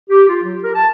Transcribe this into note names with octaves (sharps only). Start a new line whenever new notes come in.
G4
F4
F#3
A#4
A5